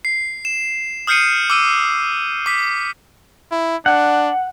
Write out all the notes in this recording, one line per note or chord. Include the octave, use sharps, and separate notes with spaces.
C7
E7
D#6 F6 G6 C7 C#7 D#7
D6 E6 D#7
D6 B6
E4
D4 F#5